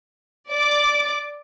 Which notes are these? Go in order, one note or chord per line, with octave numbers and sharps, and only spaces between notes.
D5 D6